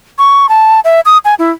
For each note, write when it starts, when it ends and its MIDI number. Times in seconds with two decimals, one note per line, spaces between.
0.18 0.49 85
0.49 0.80 81
0.84 1.00 76
1.05 1.18 87
1.25 1.34 80
1.39 1.51 64